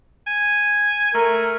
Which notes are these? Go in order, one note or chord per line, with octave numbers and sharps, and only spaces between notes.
G#5
A3 A#4